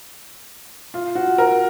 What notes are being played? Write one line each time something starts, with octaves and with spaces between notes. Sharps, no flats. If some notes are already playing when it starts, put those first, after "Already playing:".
F4
F#4
A#4